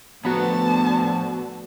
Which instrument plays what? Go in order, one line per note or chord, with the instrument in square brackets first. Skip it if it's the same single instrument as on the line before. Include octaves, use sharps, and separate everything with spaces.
[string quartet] A2 D3 [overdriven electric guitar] F3 A#5 [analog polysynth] B3 F#4 [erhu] A5